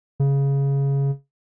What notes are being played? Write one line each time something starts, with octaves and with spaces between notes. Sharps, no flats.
C#3